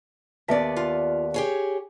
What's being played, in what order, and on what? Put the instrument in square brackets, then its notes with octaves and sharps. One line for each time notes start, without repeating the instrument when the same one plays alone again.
[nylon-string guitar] D#2 B3 D5 [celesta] E5 A5 B6
[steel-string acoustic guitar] F4
G4 G#4 C#5